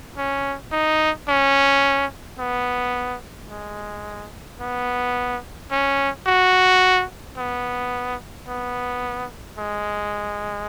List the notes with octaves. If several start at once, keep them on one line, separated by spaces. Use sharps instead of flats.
C#4
D#4
C#4
B3
G#3
B3
C#4
F#4
B3
B3
G#3